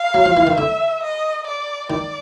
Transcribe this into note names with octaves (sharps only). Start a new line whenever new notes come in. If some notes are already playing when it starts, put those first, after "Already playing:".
Already playing: F5
F#3
F3
E3
D#3
D3 E5
D#5
D5
D#3 D5